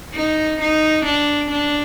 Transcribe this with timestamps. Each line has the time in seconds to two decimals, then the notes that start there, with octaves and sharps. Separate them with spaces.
0.15 D#4
0.61 D#4
1.06 D4
1.51 D4